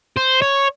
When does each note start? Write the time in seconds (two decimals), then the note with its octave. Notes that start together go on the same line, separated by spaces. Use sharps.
0.17 C5
0.42 C#5